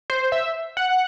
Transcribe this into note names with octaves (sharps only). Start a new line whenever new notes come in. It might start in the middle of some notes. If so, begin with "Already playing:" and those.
C5
E5
F#5